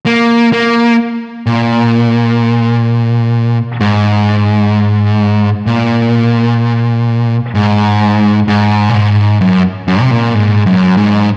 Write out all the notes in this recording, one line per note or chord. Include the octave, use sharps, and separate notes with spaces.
A#3
A#3
A#2
G#2
A#2
G#2
G#2
A#2
G#2
F#2
F#2
C3
A#2
G#2
F#2
G#2